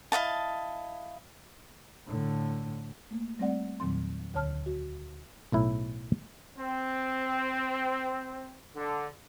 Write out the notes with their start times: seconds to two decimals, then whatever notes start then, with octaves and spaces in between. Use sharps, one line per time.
0.12 E4 D#5 F5 A5
2.07 A2 D3
3.11 A3 A#3
3.39 G3 A3 C4 D5 F#5
3.80 E2 A#2 D#3 F#3 C4 C6
4.34 D2 D3 C#5 A5 F6
4.66 F#4
5.52 B1 A2 E4
6.57 C4
8.75 D3